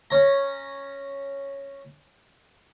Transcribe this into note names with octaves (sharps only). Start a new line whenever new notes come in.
C#4 C#5 A#5